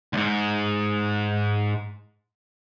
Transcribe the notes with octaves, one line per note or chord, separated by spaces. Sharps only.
D2 G#2